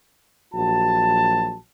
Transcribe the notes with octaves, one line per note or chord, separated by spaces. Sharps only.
A#1 F#3 F#4 A5